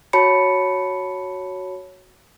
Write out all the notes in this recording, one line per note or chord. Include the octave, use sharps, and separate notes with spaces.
F#4 C#5 A5 B5 C#7